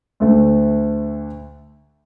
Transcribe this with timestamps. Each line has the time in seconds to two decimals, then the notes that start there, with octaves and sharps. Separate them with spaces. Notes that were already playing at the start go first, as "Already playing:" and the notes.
0.20 D2 D3 A3